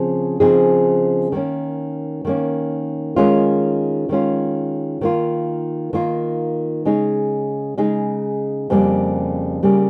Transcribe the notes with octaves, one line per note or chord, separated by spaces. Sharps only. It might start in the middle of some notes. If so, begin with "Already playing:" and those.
Already playing: C#3 F3 C4 G#4
C#3 F3 C4 D#4 G#4
D#3 A#3 C#4
D#3 A#3 C#4
D#3 G#3 C#4 F4
D#3 G#3 C#4 F4
D#3 A#3 F4
D#3 A#3 F4
C#3 G#3 D#4 G#4
C#3 G#3 D#4 G#4
F2 C#3 G3 A#3
C#3 G3 A#3